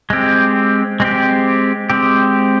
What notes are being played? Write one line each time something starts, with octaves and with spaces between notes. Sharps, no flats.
G#3 C4 G4
G#3 C4 G4
G#3 C4 G4